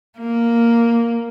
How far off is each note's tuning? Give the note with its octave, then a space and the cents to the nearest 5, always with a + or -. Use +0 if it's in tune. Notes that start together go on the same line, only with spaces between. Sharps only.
A#3 +0